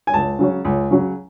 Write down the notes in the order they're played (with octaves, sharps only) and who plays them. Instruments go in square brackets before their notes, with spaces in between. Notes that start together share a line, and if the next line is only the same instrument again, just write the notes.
[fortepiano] G#5
C#2 A5
C#3 F#3 C#4
C#2
C#3 F#3 C#4